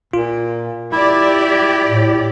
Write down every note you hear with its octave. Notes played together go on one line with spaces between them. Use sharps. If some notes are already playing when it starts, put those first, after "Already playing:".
A#2 F4
E4 G4 D5
A2